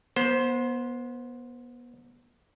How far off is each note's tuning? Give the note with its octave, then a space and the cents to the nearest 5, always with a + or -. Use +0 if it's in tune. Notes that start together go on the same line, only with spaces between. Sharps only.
B3 -30 C5 +5